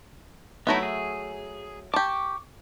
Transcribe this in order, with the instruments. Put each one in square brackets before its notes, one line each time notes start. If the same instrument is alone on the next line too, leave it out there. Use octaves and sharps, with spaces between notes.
[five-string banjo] F#3 A3 E5 [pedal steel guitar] B3 D#4 E4
[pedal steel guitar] G#4
[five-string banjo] G4 A5 [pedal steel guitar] C#6 D6